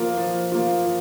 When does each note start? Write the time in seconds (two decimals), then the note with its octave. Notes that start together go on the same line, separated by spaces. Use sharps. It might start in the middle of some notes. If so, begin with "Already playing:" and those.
Already playing: F3 A#3 F4
0.17 F3
0.52 A#3 F4
0.85 F3